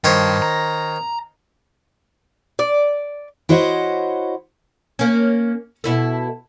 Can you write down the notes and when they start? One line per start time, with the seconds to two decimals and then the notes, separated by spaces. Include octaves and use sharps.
0.04 G2 D#3 C5 C#5
0.42 A#5
2.59 D5
3.49 E4 F#4 C5 C#5 D#5 F#5
4.99 A#3 C#4
5.84 B2 E4 A4